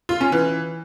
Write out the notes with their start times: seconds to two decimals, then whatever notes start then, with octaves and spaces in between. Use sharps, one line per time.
0.09 F4
0.21 C#4
0.32 E3